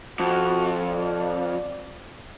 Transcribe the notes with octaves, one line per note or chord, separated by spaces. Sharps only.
F2 F#4
D5